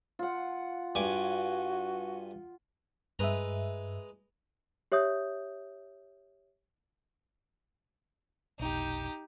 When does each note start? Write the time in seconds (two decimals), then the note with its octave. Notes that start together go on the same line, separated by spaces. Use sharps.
0.19 F4 F#5
0.95 G2 F#4 G#5 D6
3.19 G2 G#3 B4 E5 A#5
4.92 G4 C#5 E5 D#6 G6
8.59 F1 B1 D#4 G4